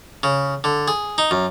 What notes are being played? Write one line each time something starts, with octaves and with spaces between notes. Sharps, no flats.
C#3
D3
G#4
D#4
F#2